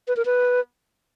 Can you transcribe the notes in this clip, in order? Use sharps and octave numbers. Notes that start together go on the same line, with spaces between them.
B4
A#4
B4